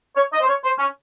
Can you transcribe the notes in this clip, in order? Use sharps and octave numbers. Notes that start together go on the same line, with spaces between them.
C#5
D#5
C5
C#5
C5
C#4